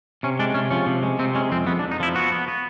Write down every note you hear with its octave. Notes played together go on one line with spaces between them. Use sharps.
C3 C#4
G#3 D4
C3 C#4
F3 C#4
C3
G#3
C3 C4
G#3 C#4
F2 C4
F2 B3
D4
F2
D#4
F3 E4
B3 F#4
B3
B3